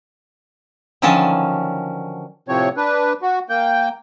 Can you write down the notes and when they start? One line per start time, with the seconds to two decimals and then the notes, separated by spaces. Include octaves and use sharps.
1.02 D3 D#3 F3 F#3 C#4 A5
2.48 A2 C3 F3 C4 C#5
2.77 D4 B4
3.22 F#4
3.49 A#3 G5